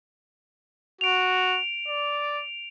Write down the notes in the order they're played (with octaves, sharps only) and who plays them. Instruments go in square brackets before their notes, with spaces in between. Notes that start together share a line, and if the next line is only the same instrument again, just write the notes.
[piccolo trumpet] F#4 [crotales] D7 F7
[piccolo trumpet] D5